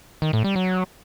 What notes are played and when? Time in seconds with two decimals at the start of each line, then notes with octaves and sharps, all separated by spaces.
0.22 D#3
0.33 A2
0.44 G3
0.56 F#3